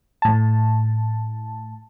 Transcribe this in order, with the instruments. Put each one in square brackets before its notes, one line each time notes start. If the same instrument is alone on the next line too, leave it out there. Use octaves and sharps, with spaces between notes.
[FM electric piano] A2 A5